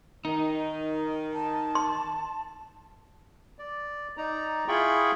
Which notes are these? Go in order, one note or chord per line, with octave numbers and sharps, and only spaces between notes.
D#3 D#4
A5
C6
D5
D#4 D5 A#5
E4 F4 G#4 G5 B5 C#6